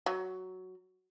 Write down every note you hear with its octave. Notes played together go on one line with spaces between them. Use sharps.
F#3